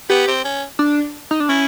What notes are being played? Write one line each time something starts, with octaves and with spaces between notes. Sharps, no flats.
B3 G4
C4
C#4
D4
D#4
D4
C#4 E4